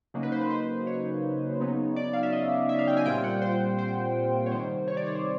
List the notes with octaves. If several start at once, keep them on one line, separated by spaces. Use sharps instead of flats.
C#3 F#3 A#3 D#4
B4
C5
B4
C5
C#5
C#3 F#3 B3 D#4
D5
F5
E5
D#5
E5
F5
G5
G#5
A#2 G3 C4 F4 G5
F#5
C5
C5
C#5
C3 D#3 G3 C5
C#5
D5
C#5
C5